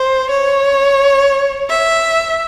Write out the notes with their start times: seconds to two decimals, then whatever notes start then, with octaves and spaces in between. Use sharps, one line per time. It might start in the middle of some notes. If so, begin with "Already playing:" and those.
Already playing: C5
0.30 C#5
1.69 E5